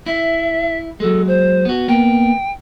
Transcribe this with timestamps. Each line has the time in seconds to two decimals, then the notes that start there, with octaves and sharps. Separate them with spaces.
0.06 E4 E5
1.00 F#3 G#3 A4
1.27 C5
1.65 B3 F#4
1.88 A#3 B3 G5